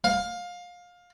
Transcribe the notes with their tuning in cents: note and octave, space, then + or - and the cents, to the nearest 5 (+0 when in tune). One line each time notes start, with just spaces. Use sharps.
F5 +20